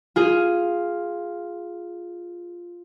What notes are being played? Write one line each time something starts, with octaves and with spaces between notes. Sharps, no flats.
F4 G#4